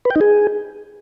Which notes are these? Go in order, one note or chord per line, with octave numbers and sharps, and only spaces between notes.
B4
G5
D#4
G#4